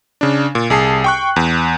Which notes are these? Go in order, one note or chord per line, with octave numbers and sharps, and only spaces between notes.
C#3 D4
A#2
C2 G#4 A5 C7
G5 C#6 F#6
E2